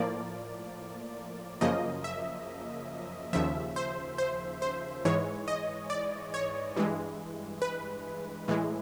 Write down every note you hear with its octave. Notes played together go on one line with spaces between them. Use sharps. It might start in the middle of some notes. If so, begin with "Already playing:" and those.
Already playing: A2 F3 A#3 D5
F#2 C#3 F3 A#3 D#5
E5
D#2 C#3 F3 E5
C5
C5
C5
G#2 E3 G#3 C#5
D#5
D5
C#5
G2 E3 G#3
B4
A2 E3 G#3